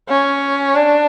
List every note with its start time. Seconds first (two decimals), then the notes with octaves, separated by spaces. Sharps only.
0.09 C#4
0.75 D4